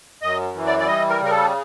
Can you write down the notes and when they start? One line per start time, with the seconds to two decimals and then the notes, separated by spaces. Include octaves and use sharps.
0.22 F#2 D#5
0.55 E3
0.66 D5
0.79 D5
0.87 G3 D#5
1.10 A#4
1.20 C#3 A#4
1.31 A4